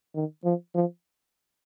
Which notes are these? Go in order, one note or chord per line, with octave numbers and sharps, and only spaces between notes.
D#3
F3
F3